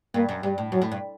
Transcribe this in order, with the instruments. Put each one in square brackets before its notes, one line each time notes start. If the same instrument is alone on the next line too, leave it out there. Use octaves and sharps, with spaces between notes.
[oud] G2 [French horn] A#3
[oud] F#2
[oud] G2 [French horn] G3
[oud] A2
[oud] F#2 [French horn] F#3
[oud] A2
G2